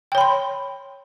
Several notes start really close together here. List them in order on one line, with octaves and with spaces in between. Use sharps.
G5 C#5 B5 C6